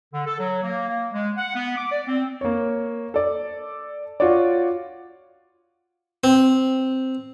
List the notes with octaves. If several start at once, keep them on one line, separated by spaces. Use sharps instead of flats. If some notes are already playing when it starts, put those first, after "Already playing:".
D3
A4
F#3
A#3
A#3
G#3
F#5
B3
D6
D5
C4
A#3 C#5
A4 D5
F4 F#4 C#5 D5
C4